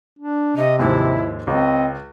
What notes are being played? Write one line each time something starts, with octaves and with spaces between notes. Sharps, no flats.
D4
C3 D#5
D#2 G#2 F3 E4
C#2 C4 D#5